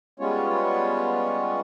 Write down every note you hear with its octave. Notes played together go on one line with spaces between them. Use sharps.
G3 G#3 B3 C#4 F4 C#5